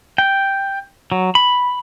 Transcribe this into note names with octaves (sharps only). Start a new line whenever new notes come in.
G5
F#3
B5